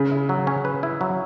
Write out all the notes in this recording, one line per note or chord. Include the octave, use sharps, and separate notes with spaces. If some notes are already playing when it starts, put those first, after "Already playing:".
Already playing: C#3
E4
F#3
C#4
B4
E4
F#3